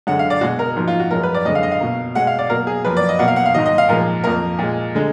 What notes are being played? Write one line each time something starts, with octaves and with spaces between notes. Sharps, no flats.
F#2 D3 G#3 F#5
F5
D5
B2 G#3 F#4
A#4
G#2 F3 A#3
F4
F#4
F#2 F3 G#3 A#4
B4
D5
F#2 D3 G#3 D#5
F5
D#5
F5
B2 A#3
B2 G#3 F#5
F5
D5
B2 F#3 A#3 A#4
G#4
F#2 F3 A#3 B4
D5
D#5
B2 F#3 A#3 F#5
F5
F#5
F5
G#2 D#3 F#3 D#5
D#5
F5
A#2 F3 G#3 A#4
F2 F3 A#3 A#4
A#2 G#3
D3 G#3